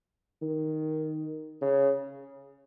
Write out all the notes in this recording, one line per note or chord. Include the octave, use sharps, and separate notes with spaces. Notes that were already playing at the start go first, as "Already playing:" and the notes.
D#3
C#3